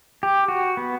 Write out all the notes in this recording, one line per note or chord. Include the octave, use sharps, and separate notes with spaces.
G4
F#4
B3